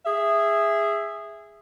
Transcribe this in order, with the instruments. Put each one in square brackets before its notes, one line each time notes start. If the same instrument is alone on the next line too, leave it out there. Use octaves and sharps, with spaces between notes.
[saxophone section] G#4 E5